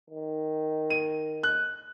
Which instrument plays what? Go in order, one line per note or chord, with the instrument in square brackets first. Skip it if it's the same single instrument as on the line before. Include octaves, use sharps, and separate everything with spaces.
[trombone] D#3
[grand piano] D#7
F#6